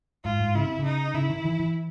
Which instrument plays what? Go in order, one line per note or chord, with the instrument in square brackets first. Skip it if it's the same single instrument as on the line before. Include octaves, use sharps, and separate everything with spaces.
[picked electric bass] G#2 [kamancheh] F4
[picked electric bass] G#2
[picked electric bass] C#3 [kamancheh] E4
[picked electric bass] C3
C#3
[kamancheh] D#4
[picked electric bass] C#3 [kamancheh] E4
[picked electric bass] D#3
E3
E3